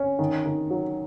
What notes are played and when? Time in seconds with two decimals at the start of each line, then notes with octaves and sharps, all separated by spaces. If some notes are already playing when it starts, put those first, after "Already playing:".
Already playing: C#4
0.19 D#3
0.46 D#3
0.70 F#3